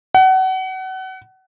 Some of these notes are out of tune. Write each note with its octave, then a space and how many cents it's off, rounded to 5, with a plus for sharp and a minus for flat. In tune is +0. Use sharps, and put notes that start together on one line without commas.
F#5 +30